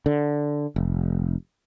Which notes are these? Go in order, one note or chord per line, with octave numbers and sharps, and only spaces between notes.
D3
F1